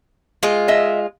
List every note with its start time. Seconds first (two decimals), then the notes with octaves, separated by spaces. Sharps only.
0.43 G#3 F4
0.68 D#5 E5